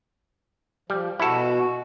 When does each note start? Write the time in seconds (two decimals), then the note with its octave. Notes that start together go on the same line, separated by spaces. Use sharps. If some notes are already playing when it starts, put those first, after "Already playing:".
0.90 F3 G3
1.20 B2 E4 F#4 A4